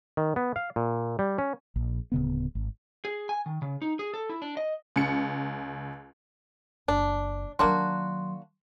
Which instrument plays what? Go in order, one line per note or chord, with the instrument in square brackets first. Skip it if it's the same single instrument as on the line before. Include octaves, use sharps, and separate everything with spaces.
[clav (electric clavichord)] D#3
B3
F5
A#2
G3
C#4
[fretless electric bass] A#1
D1 C#3 B3
G#1
[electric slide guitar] G#4
G#5
D#3
C#3
D#4
G#4
A4
E4
D4
D#5
[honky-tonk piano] C#2 C#7
[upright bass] F#1 [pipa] D4
[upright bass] D#3 F#3 [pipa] A#3 D4 F#4 [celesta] C6